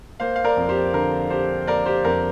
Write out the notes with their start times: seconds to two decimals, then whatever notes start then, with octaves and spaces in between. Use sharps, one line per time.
0.20 A#3 C5 F5
0.36 F5
0.44 A#4 D5
0.57 F2
0.69 G4 C5
0.93 D3 A#4
1.30 D4 G4 C5
1.67 A#3 A#4 D5
1.85 G4 C5
2.05 F2 A#4